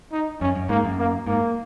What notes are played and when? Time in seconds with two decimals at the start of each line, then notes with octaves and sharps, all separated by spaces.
0.12 D#4
0.41 F#2 C#4
0.55 F#2
0.69 G#2 A#3
0.85 F#2
0.99 A#3
1.26 G#2 A#3